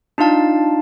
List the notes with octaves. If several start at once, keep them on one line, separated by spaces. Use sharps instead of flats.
D4 D#4 F4 F5 A5